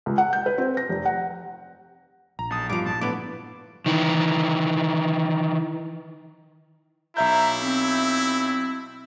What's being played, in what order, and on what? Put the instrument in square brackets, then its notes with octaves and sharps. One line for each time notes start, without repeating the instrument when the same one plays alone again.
[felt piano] C#2
F#5
G6
B4
C4
A#6
F1
F#5
[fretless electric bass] A#1 [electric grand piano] A#5
[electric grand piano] B1 D#6 [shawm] A5
[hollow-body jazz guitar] G2 F3 [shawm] D6
[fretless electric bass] A#2 [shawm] A5
[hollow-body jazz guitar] A2 B3 [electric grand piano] D3 B4 [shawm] D6
[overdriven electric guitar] D#3 E3
[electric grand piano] B1 E5 G6 [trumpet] E4 [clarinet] A#5
[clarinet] C4